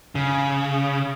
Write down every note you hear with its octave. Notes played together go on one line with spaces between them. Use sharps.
C#3